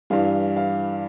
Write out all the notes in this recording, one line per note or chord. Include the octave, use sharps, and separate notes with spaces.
G2 E3 G3 F5
F5